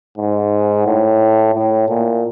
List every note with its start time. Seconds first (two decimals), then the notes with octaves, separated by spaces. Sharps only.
0.18 G#2
0.86 A2
1.54 A2
1.88 A#2